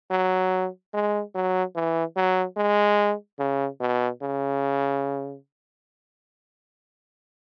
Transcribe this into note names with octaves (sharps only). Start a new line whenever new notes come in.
F#3
G#3
F#3
E3
F#3
G#3
C#3
B2
C#3